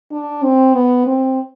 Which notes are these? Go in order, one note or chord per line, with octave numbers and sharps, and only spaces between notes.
D4
C4
B3
C4